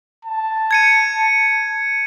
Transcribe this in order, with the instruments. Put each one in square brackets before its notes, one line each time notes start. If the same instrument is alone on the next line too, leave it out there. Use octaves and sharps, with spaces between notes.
[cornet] A5
[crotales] G#6 C#7 D#7